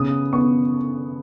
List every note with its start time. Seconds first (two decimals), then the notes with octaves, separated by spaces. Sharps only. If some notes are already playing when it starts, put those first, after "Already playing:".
Already playing: C#3 B3 D#6
0.33 B3 C#6